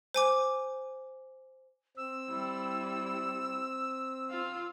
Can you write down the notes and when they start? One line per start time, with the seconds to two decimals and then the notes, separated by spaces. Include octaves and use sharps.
0.14 C5 G#5 D6
1.97 C4 E6
2.29 G3 E4
4.30 F4 F5